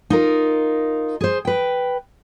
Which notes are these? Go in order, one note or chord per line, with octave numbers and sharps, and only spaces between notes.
D#4 F4 A#4
G#4 C5
B4 G5